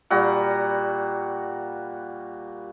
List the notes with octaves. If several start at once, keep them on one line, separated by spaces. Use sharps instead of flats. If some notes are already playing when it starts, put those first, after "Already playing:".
A#2 G3 F#4